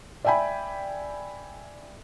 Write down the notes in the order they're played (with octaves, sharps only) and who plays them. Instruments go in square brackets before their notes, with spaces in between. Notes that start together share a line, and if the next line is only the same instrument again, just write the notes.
[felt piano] D5 E5 G5 G#5 B5